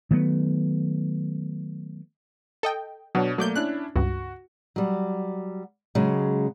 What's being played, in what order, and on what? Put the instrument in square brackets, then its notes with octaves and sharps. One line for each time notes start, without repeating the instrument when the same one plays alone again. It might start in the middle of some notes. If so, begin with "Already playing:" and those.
[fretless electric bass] D#3 F#3 A3 B3
[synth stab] A4 D#5 G5
[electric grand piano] B2 D4 C#5 [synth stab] F#3
[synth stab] F#3 D5 G6 [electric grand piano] A3 A#3
[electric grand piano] C#4 D4 E4 [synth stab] F#6
[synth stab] C#2 G2 [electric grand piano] F#4
[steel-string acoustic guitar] F#3 G3
C#3 F#3 G#3